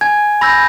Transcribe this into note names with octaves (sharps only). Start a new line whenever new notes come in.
G#5 G#6
B5 E6 G6 A#6